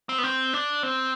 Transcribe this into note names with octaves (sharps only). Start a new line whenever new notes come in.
C4
B3
C4
D4
C4